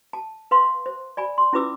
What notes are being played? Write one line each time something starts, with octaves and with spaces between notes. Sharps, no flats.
A5
B4 F5 C6
C5
D5 G#5 B5
C6
C#4 E4 F4 B4 D6 E6